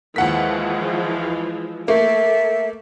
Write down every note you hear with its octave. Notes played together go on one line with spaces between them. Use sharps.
D#2 E3 F3 G#3 F#5 B6
A3 A#3 A4 E5